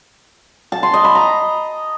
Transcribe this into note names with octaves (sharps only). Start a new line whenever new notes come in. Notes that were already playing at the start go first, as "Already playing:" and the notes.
A5
C6
D#5
B5
A#5